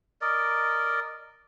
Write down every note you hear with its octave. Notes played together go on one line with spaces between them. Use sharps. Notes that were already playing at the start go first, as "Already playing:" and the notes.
A#4 D5 D#5